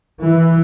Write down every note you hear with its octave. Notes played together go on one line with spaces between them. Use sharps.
E3